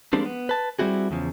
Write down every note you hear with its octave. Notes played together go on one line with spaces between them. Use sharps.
F3 G3 G#3 A#3 C4 D4
B3
B4 A5
G3 C4 E4 F#4 G#4
E2 C#3 F3